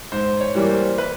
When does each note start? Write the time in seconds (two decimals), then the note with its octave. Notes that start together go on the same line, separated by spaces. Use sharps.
0.12 G#2 C5
0.41 C#5
0.55 E3 G3 A#3
0.69 C5
0.98 B4